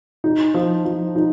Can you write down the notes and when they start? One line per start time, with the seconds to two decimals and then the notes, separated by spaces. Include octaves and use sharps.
0.24 D#4
0.54 F3
0.85 F3
1.16 D#4